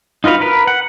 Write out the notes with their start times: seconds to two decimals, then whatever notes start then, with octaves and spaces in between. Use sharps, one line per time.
0.24 D#4 F4 F#4 B4 F5
0.41 A#4 B4
0.67 F#5